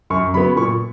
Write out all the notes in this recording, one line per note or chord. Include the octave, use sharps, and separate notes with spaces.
F#2 C#6
C#3 F#3 B3 B5
A#2 C#6